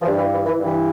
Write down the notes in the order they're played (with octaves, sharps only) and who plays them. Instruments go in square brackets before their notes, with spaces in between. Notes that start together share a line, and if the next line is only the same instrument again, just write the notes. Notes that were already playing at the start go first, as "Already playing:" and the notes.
[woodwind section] G2 E3 F3
E3
E3
E3
G2 E3